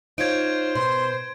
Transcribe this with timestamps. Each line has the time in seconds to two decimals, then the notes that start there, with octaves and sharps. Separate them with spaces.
0.18 D#4 F4 C5 C#5 G#6 D7
0.75 B2 C6